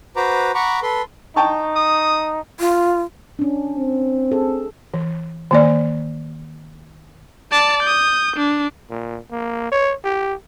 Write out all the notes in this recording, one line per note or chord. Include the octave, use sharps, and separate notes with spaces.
F#4 B4 C5 A#5 D6
F#5 A#5 B5 C#6 D6
A4 B4 C6
D#4 G5 A5 C#6
D#6
F4
C#4 D4
C4
G#4 A4
E3
D#3 A#3 D5
D5 A5
D#6 G6
D4
A#2
A#3
C#5
G4